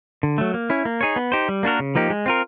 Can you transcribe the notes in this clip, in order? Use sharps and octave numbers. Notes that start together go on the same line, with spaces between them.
D3
F#3 A3
A#3
C#4 E4
A#3
D#4 G#4 C#5
B3
D#4 G4 C5
G3
A#3 D4 F#4 A#4
C#3
F3 A#3 D#4 G4
G#3
C4 F4 A#4